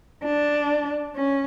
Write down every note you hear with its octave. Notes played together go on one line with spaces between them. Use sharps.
D4
C#4